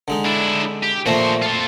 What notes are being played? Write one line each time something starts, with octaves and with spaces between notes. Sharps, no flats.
D3 G#3 D#4
D4 E4
G4
A#2 F3 A3 F#4 C5
F4 A4